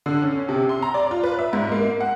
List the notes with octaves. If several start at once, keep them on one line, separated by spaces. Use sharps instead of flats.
D3
C#4
C3
C6
A#5
D5
F4
B4
E5
G#2
A#3
F#5